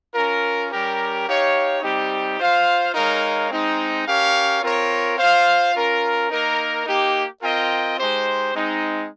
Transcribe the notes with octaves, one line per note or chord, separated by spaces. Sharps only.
C#4 F4 A#4
G3 C#4 G4 A#4
D#4 G4 C#5 F5
G3 C4 D#4 G4
F4 C5 F5
G#3 D#4 A#4 C#5 F5
G#3 C4 D#4
C#4 G4 A#4 C#5 F5
C4 F4 A#4 C#5
F4 C5 F5
C#4 F4 A#4
A#3 D#4 A#4
A#3 D#4 G4
C4 F4 A#4 D#5 G5
G#3 D#4 G4 C5
G#3 C4 D#4